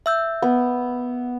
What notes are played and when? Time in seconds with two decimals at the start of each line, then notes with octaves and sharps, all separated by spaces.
0.06 E5 E6 G6
0.42 B3